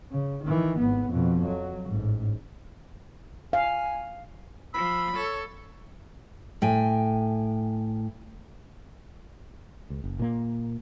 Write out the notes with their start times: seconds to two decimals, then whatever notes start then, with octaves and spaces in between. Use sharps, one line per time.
0.11 C#3
0.44 D#3 E3
0.78 G#1 B3
1.09 F2 B2
1.45 F#3
1.86 A1 G#2
3.53 F5 G#5
4.74 F3 B5 E6
5.16 A4 C#5
6.62 A2 G5 G#5
9.90 C#2
10.04 F#1
10.19 A#2 A#3